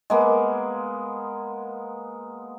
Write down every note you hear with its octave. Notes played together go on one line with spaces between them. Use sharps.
G#3 A#3 B3